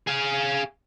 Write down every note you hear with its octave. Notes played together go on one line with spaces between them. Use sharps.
G#4 F5